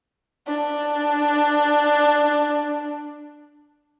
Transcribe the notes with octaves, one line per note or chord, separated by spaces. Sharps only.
D4